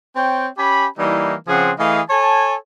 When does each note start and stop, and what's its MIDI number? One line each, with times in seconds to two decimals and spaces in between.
0.16 0.47 60
0.16 0.47 73
0.16 0.47 79
0.58 0.87 61
0.58 0.87 67
0.58 0.87 80
0.58 0.87 83
0.98 1.34 52
0.98 1.34 55
0.98 1.34 58
0.98 1.34 63
0.98 1.34 64
1.47 1.71 49
1.47 1.71 53
1.47 1.71 60
1.47 1.71 68
1.47 1.71 78
1.79 2.00 52
1.79 2.00 57
1.79 2.00 68
1.79 2.00 75
1.79 2.00 77
2.09 2.54 69
2.09 2.54 73
2.09 2.54 80
2.09 2.54 81